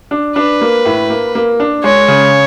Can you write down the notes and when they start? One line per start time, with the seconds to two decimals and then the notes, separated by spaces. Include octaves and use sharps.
0.11 D4
0.36 D4 B4
0.61 A#3
0.85 A2
1.10 A#3
1.35 A#3
1.60 D4
1.84 G#3 C#5
2.08 C#3